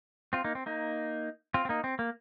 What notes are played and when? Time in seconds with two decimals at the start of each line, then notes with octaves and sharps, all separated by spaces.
0.33 C4 F4
0.44 A#3 D#4
0.55 C4
0.66 A#3 D#4
1.54 C4 F4
1.65 C4
1.69 A#3 D#4
1.84 C4
1.99 A#3